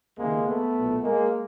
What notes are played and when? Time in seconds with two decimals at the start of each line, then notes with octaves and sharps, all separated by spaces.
0.18 C#2 C3 D#3 G#3 A#3
0.46 A3 B3
0.76 B1 A#2
1.03 G#3 A#3